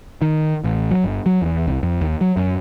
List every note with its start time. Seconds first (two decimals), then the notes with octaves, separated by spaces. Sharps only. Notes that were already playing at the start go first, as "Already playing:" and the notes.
0.22 D#3
0.64 A1
0.91 F#3
1.04 G1
1.26 F#3
1.42 E2
1.67 C2
1.83 F2
2.01 D#2
2.21 F#3
2.37 F#2